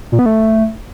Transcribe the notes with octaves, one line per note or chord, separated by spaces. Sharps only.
A#2
B3
A3